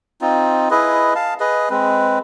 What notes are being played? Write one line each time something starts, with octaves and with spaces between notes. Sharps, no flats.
C4 D#4 F4
E4 G#4 B4 D#5
F5 A5
G#4 B4 D#5
G#3 C4 B4